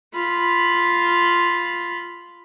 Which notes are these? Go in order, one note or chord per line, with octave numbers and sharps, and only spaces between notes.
F4 B5